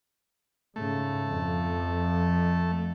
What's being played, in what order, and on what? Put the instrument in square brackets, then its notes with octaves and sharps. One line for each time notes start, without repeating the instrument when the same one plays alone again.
[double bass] G#2 C#3 [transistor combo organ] A3
[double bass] F2 F3